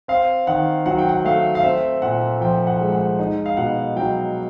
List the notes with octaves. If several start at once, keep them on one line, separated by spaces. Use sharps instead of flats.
C4 F5
D#3 F#5
F#3 F#5
G5
F#5
A3 F5
F5
C4 E5
A#2 F#5
F3 G5
F#5
G#3
F#5
D#4
F5
B2 F#5
F#3 G5